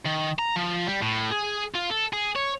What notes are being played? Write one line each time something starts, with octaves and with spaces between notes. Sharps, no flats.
D#3
A#5
F3
G3
A2
G#4
F4
A4
G#4
C#5